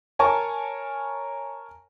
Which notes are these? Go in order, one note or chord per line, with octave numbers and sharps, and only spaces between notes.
A#4 C#5 G#5 A5 C#6